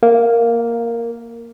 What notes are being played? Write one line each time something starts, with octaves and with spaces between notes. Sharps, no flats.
A#3